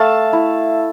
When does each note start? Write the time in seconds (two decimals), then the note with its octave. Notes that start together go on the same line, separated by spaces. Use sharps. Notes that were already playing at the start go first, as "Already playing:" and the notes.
Already playing: A3 F5 A5
0.33 E4